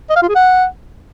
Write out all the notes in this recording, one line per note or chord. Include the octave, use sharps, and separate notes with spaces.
D#5
F5
F4
G#4
F#5